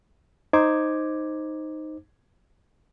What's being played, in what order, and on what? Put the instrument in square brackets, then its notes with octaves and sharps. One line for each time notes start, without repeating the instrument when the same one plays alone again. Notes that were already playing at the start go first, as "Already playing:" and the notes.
[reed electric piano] D#4 C5 D6 G#6